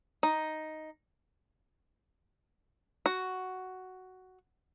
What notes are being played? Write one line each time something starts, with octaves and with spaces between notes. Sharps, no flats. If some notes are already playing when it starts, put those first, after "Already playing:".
D#4
F#4